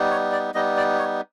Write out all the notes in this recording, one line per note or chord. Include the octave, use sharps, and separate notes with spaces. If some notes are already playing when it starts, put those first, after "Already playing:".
Already playing: G3 B3 D#4
C#5
D5
G3 B3 D#4 D#5
D5
C#5